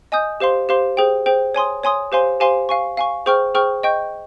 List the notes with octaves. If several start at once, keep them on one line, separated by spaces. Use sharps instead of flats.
D#5 G#5 D#6 G6
G4 C5 F5 C6
G4 C5 F5 C6
G#4 C5 G5
G#4 C5 G5
C#5 G#5 C6 D#6
C#5 G#5 C6 D#6
G4 C5 F5 G#5 C6
G4 C5 F5 G#5 C6
F5 G#5 C#6
F5 G#5 C#6
G#4 C5 G5 C#6 F6
G#4 C5 G5 C#6 F6
D#5 G5 C#6 G6